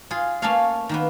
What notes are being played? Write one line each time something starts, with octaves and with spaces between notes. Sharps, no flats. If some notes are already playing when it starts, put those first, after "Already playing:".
F4 G#4
A3 A#3 C#4 A4 C#5 F5
D#3 A#3 B3